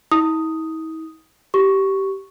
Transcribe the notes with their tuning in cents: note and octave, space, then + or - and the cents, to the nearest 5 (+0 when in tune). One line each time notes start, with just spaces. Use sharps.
E4 -45 D#6 +0
G4 -15 C#6 +0